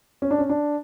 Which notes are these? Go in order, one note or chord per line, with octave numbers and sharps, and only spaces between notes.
C#4
D4
C#4
D4